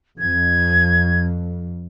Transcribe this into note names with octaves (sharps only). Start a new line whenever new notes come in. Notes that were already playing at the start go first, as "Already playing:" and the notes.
F2 G#6